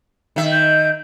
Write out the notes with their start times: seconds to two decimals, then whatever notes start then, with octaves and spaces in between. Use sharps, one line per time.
0.36 D#3 E5
0.51 G6